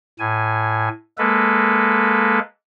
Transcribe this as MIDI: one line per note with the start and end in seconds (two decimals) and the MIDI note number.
0.19 0.88 45
0.19 0.88 80
1.18 2.39 56
1.18 2.39 58
1.18 2.39 69
1.18 2.39 71